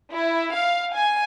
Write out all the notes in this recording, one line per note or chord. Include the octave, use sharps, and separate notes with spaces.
E4
F5
G#5